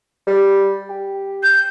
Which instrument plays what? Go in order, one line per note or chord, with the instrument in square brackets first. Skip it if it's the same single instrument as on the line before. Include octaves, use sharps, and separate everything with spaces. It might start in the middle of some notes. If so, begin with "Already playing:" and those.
[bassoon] G3
G4
[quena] G6